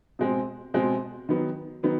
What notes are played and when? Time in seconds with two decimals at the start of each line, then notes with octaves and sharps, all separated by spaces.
0.19 B2 G#3 C4
0.74 B2 G#3 C4
1.29 D#3 F#3 B3
1.83 D#3 F#3 B3